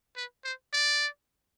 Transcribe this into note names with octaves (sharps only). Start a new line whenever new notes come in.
B4
C5
D5